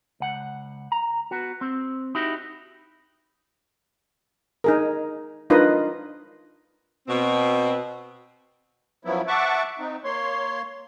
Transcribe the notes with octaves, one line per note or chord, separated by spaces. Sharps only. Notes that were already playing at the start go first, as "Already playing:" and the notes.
C#2 F#5
A#5
B3 F#4
C4
D#4 E4 F#4 G4
D#4 G#4 A#4
D4 D#4 F4 A#4 B4 D#5
B2 C4
F#2 F3 F#3 B3 E4
E5 F#5 A5 C#6 D6
C4 D#4
A#3 C#5 C6